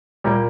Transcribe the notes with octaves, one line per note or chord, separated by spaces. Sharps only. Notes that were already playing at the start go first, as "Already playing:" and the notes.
A#2 G3 A#3